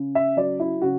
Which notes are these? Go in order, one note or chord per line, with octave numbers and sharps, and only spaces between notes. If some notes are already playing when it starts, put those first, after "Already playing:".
Already playing: C#3
E5
F#3 D5
E4
C#3 F#4